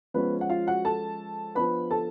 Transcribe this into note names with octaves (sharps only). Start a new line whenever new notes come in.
F3 G#3 B3 C#4 B4
F#5
F4 F5
F#4 F#5
A4 A5
F3 B3 D4 B4 B5
A4 A5